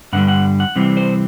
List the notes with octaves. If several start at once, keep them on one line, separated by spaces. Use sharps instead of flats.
G2 D3 G3 F#5
F#5
F#5
C3 E3 G3 C4
C5